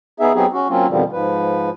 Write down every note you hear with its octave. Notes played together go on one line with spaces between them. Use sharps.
B3 D#4 G#4 E5
F#3 B3 C4 D#4 G4 G#4
C#4 F#4
F#3 A#3 C4 C#4 F4
F2 B2 D3 D#3 F3 G3
G#2 F3 B4